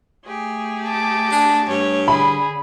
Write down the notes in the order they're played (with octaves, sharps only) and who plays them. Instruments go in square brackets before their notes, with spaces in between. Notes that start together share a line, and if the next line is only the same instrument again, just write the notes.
[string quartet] A3 G4 G#4
[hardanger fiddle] A5 D6
[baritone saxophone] D4
[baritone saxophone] G2 [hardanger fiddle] C#5
[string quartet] D3 [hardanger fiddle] G#4 [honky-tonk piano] B5